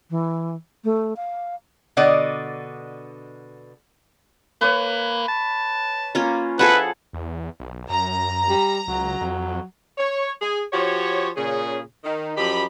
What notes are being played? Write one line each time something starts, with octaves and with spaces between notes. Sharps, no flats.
E3
A3
F5
B2 D3 D5 D#5 F#5
A#3 B4 C#5 D6
A5
A#3 C#4 F4
F3 E4 G#4 A4 B4 F#5
E2
B1
F#2 A#5
G3
C#2 F#3
F2
C#5
G#4
F3 F#4 G4 C#5
A#2 C#3 G#4
D#3 D#4
F#2 F3 G4 D#5 B5